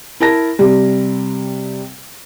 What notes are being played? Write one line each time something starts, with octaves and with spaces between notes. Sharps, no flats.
E4 A#4 A5 A#6
C3 G3